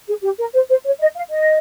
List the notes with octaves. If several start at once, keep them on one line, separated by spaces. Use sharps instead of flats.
G#4
G4
A#4
C5
C5
C#5
D#5
F5
D#5